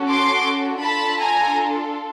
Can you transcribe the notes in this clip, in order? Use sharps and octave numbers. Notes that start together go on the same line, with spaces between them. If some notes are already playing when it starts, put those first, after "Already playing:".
Already playing: C#4 F#4 A4
C6 D6
D4 F4 A4 A5 B5
G#5 A#5